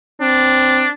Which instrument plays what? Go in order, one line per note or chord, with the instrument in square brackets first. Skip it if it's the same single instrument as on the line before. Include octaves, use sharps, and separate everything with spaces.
[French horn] C4 [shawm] D4